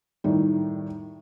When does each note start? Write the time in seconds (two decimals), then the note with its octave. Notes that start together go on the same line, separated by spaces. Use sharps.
0.24 A2 D#3 G3